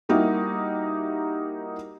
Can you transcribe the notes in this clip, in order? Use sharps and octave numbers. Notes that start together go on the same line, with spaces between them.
G3 A#3 D#4 E4 F#4 G4